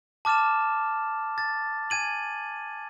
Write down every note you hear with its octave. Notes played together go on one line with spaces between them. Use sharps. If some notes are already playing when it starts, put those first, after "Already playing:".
A5 D6 F6 A6 E7
A6
G#5 G#6 D#7 F#7